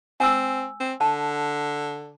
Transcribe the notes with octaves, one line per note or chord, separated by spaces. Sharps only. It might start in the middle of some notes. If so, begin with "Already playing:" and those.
C4 G#5 E6
C4
D3 A5